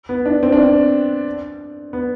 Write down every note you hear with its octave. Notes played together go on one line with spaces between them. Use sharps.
B3
D4
C4
D4
C4
B3